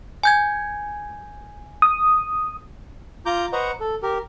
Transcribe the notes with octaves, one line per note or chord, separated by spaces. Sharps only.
G#5 G6 G#6
D#6
F4 A#5 D6 G6
B4 C5 D#5 F#5 A#5 C#6
A4
G4 A#4